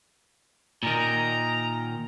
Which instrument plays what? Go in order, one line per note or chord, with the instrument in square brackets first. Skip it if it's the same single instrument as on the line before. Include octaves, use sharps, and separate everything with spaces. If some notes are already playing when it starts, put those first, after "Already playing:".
[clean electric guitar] A#2 D#3 [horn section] A#5